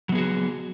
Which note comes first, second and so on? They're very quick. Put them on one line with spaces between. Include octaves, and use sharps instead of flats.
F#3 B3 G#4 F#4